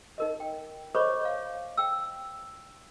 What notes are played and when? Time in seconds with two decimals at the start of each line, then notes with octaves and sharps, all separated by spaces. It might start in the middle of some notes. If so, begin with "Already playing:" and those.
0.18 D#4 A#4 D#5
0.40 G5
0.95 C5 C#5 D#5 B5 C#6 D6
1.21 C#5 F5
1.77 G5 E6